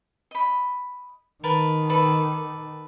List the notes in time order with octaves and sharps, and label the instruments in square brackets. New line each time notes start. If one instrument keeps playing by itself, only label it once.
[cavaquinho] D#5 B5
[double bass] D#3 [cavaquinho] A#4 B4 A5
[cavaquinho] A4 B4 D5